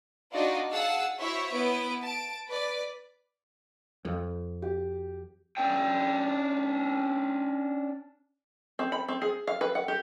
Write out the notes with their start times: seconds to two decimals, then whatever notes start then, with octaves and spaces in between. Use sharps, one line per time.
0.33 D4 D#4 F4 F#4 D5 D#5
0.70 G#4 F5 F#5 A5 E6
1.19 E4 F#4 C5 C#5 E5
1.52 B3 E4 B4 D7
2.02 A5 D7
2.48 B4 D5
4.05 F2
4.62 G4
5.57 C#4 D4 G5
8.79 C4
8.92 B5
9.08 C4
9.22 G#4
9.47 F5
9.61 B4
9.75 F#5
9.88 G4